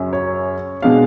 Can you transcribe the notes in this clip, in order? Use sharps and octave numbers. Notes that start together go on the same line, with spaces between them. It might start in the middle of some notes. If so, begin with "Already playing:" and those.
Already playing: F#2 C#3 F#3 C#4
C#5
B2 G#3 D4 F5